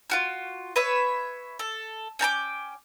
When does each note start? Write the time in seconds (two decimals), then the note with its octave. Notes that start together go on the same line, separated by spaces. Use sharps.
0.10 F4 F#4 F6
0.76 B4 C#5 E5
1.59 A4
2.19 C#4 G5 A5 D6